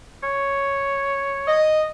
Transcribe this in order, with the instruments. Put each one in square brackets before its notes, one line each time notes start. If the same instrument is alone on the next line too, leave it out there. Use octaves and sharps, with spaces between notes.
[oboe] C#5
[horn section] D#5